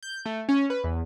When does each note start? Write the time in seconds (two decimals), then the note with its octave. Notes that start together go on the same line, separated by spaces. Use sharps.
0.03 G6
0.26 A3
0.49 C#4
0.70 B4
0.84 E2